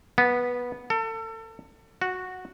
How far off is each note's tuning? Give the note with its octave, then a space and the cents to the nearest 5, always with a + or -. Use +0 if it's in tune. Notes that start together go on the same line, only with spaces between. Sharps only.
B3 -10
A4 +30
F#4 -5